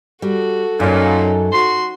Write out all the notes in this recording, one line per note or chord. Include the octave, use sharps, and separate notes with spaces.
G3 F#4 A4
F#2 A#2 F#3 C#4 D#4
F#4 C6